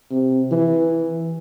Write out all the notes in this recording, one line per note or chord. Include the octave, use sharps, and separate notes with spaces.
C3
E3